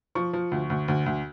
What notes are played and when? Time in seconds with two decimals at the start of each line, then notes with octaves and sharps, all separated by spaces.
0.15 F3 C#6
0.33 F3
0.52 D2
0.70 D2
0.88 D2
1.06 D2